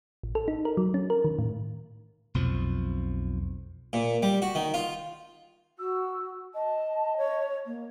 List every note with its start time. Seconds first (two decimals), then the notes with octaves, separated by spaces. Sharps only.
0.23 A1
0.35 A4
0.48 D#4
0.65 A#4
0.77 F#3
0.94 C#4
1.10 A#4
1.24 D#3
1.39 A2
2.34 B1 F2 F3
3.93 A#2
4.23 G3
4.42 F#4
4.55 D#3
4.74 F4
5.78 F#4 E6
6.54 D#5 A5
7.17 C#5
7.66 A#3